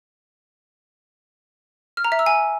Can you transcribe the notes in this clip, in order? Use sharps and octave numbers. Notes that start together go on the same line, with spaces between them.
F6
A#5
E5
E6
G#5